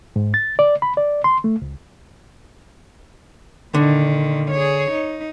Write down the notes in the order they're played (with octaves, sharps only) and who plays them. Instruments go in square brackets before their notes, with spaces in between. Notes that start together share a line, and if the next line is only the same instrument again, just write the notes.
[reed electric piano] G#2
A6
D5
B5
D5
C6
A3
C#2
[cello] A#2 D#3 [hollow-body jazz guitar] D3
[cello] G#4 C#5
D#4